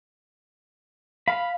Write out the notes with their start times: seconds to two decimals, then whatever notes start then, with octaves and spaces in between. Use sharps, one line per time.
1.28 F5 B5